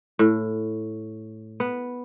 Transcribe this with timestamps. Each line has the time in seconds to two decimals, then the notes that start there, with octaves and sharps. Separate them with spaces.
0.19 A2
1.60 B3